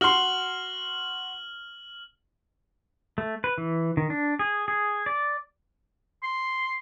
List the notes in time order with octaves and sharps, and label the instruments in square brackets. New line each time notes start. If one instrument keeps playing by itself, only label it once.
[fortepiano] F#4 C6 [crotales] F6 F#7
[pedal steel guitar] A3
B4
E3
D#3
D4
G#4
G#4
D5
[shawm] C6